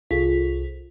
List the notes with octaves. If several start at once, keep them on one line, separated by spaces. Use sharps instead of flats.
C2 F4 G#4 A4 B6